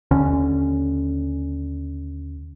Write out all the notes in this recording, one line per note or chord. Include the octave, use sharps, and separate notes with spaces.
D#2 D3 C#4